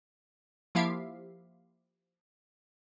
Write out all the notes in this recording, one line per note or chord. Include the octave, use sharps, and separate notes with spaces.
F3 A#3 E4 G4 E5 F5